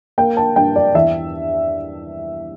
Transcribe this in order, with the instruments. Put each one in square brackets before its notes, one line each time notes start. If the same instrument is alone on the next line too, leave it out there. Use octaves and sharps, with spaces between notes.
[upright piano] A#3 G5
A5
G2 G5
D5
E2 E5